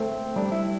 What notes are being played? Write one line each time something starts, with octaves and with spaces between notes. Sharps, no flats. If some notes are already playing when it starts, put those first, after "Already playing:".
Already playing: A3 C4
G3 D4
E4